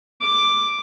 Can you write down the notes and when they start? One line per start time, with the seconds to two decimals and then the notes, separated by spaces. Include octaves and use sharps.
0.21 D6